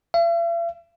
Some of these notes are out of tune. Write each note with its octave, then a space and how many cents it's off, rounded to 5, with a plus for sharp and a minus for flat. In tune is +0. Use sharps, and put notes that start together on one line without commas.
E5 +45